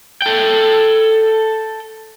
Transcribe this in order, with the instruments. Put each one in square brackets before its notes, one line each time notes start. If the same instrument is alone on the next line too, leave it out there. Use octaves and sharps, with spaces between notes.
[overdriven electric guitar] A4 G5